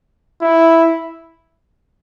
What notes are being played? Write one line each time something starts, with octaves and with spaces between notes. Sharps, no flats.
E4